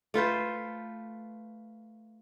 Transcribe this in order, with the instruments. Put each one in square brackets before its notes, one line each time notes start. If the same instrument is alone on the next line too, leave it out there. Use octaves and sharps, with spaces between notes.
[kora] A3 F4 B4 C5